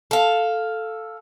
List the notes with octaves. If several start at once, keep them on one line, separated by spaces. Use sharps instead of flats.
A4 F5